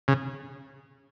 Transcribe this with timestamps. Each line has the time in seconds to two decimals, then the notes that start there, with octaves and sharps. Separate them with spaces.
0.08 C#3